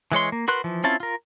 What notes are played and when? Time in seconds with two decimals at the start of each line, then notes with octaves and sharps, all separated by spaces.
0.12 E3 G#3 C#5 C6
0.32 A#3
0.48 F#4 A#4 B4 C6 F#6
0.64 E3 F3
0.84 C4 C#4 E4 F4 A5
1.00 F4 A#4